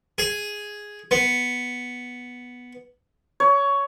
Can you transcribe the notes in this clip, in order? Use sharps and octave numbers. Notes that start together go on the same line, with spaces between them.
G#4
B3
C#5